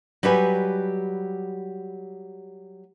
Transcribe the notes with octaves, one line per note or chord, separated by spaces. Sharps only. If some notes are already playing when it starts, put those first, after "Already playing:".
F#3 G3 G4 B4 G#5